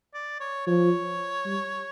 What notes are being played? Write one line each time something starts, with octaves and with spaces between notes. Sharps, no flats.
D5
C#5
F3 C#5
G3